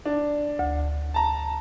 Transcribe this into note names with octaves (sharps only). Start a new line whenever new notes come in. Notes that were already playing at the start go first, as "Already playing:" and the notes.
D4
D2
A5 A#5